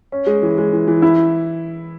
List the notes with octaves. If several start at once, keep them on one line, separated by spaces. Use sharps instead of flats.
C#4
G#3
E3
G#3
E3
E3
E4